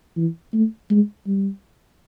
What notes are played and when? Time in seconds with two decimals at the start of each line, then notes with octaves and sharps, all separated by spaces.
0.17 E3
0.54 A3
0.90 G#3
1.27 G3